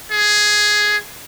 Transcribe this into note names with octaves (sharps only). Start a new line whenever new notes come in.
G#4